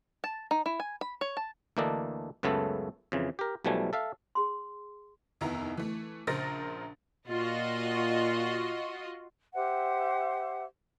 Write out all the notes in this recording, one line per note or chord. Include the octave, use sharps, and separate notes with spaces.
A5
D#4
E4
G#5
B5
C#5
A5
D2 E3 A#3 D4 A4 D#5
C#2 F#2 C#3 A3 B3 A4
F2 C#3 E3
G4 A#4
B1 B2 F3 G3 A3 G#5
A4 E5 F5
G#4 C6
F1 D#2 B3 E4 A#5
E3 A3
A#1 C#3 A#4 C5 A6 A#6
A#2 F4 F#4 D#5
G4 C5 E5 F#5